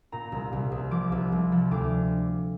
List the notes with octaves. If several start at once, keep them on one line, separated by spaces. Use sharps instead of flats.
A#2 A#5
C2
C2
C2
F3 D6
C2
C2
F3
D2 D6